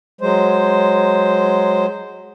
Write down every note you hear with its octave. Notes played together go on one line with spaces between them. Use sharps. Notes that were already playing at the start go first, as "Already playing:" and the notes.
F#3 G#3 C5